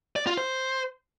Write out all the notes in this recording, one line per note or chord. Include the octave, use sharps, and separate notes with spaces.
D5
F4
C5